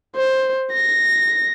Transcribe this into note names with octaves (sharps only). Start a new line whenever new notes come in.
C5
A#6